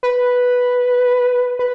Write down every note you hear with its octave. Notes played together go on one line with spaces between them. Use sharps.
B4
B4